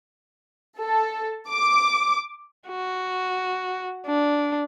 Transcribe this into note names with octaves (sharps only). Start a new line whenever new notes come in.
A4
D6
F#4
D4